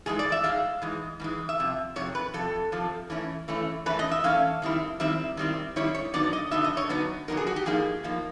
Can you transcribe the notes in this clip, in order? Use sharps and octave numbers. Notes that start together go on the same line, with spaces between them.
G#2 E3 G#3 G#4
D5
E5
G#2 E3 G#3 F5
G#2 E3 G#3
G#2 E3 G#3
E5
F2 C3
F2 C3 C#5
B4
F2 C3 A4
F2 C3 F3
E3 A3 C#4 E4
E3 A3 C#4 E4
E3 A3 C#4 E4 B4
D#5
E5
E3 A3 C#4 E4 F5
D#3 G3 C4 E4
D#3 G3 C4 E4 E5
D#3 G3 C4 E4
D#3 G3 C4 E4 C#5
C#5
D3 F#3 B3 D#4 D5
D#5
D3 F#3 B3 D#4 E5
D#5
C#5
D3 F#3 B3 D#4 B4
D3 F#3 B3 D#4 A#4
G#4
F#4
G4
A2 F3 A#3 D#4 G#4
A2 F3 A#3 D#4